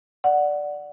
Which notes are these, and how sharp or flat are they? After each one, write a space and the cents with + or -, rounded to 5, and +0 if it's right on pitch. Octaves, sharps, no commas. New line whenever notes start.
D5 +0 F#5 +0